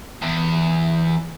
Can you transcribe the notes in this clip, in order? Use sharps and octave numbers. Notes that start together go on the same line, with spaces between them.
E2